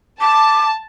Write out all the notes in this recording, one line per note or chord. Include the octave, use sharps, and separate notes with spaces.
A5 D6